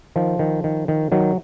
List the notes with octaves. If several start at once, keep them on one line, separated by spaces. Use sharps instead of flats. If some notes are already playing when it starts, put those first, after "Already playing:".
D#3 F3
D#3
D#3
D#3
D#3 F#3